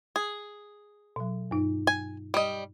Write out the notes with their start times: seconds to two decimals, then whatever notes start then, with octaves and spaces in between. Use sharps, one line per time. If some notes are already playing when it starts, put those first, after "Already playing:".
0.16 G#4
1.16 B2 F#3
1.51 G2 D#4
1.87 G#5
2.34 G3 D#5